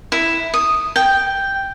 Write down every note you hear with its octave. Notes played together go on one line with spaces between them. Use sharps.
E4
D#6
G5